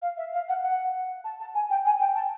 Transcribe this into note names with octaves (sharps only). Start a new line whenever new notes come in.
F5
E5
F5
F#5
F#5
A5
A5
G#5
G5
G#5
G5
A5